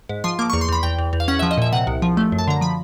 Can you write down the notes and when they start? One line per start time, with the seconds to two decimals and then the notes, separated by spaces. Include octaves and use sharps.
0.09 G#2
0.24 F3 C6
0.39 A#3 D6
0.50 E2 C#6
0.61 C6
0.69 E2 B5
0.83 E2 G5
0.99 E2
1.13 E2
1.20 F5
1.28 C#4 F#5
1.39 F3 E5
1.51 D#5
1.58 A#2 E5
1.73 C3 F#5
1.87 C2
2.02 F3
2.17 A3
2.32 F#2
2.39 A5
2.48 D3 A#5
2.61 F3 B5